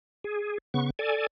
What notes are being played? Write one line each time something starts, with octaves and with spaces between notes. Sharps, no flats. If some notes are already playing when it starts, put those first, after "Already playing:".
G#4
C#3 B3 C#6
A4 D5 G#5